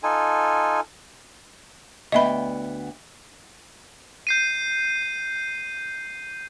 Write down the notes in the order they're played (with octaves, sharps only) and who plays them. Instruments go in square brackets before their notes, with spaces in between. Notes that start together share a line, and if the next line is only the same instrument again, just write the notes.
[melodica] D#4 F4 A4 G#5
[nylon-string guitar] D2 B3 G5 [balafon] D#5 E5 B5
[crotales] G6 C7 D#7